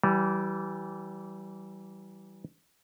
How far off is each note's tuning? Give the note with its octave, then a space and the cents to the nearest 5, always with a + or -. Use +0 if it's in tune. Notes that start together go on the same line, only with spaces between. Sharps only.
E3 +0 G3 -25